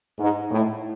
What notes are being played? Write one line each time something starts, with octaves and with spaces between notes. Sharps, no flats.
G#2
A2